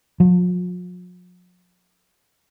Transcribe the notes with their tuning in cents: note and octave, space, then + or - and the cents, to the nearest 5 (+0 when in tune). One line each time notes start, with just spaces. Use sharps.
F3 +45